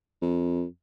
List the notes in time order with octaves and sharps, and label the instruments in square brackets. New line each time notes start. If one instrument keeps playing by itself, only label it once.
[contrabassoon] F2